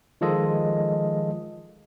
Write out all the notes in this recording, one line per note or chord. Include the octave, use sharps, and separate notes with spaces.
D#3 F3 G#3 F4 A4 D#5